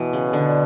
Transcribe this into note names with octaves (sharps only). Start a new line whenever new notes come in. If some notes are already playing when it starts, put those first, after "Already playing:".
Already playing: B2 E3
C#3
D3